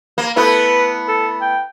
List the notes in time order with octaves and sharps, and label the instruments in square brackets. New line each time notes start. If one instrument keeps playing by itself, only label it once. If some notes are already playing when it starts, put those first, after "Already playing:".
[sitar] A#3
[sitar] A3 B3 E4 [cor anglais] B4
[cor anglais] A4
G5